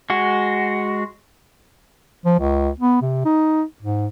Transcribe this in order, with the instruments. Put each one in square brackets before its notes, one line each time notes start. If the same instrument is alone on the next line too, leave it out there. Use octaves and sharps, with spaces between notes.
[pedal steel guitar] G#3 F#4
[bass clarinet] F3
C#2
B3
C3
D#4
G#2